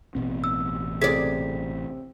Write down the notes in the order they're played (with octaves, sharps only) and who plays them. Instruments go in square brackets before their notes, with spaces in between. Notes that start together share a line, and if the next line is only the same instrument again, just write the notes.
[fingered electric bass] A1 B2 C4
[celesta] E6
[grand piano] C3 [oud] G#4 D5 [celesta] B6